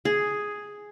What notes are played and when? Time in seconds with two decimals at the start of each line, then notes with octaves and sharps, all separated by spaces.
0.05 G#4